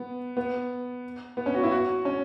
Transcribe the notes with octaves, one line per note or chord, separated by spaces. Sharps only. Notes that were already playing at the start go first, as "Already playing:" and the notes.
Already playing: B3
B3
B3
C#4
F#4
E4
F#4
C#4